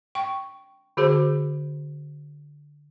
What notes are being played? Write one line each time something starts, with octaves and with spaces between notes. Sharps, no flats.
G5 C#6
D3 F#4 G#4 C5